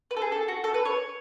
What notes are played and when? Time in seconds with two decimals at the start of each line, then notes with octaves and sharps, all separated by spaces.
0.11 B4
0.17 A4
0.22 G#4
0.32 A4
0.48 F#4
0.64 A4
0.74 B4
0.85 C#5